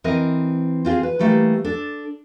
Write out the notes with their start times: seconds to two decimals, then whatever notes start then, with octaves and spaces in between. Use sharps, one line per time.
0.04 E3 C4 A#4 D#5
0.85 C4 F4 G4 G#4
1.03 B4
1.19 E3 G3 A3 A#3 G4
1.65 D4 A4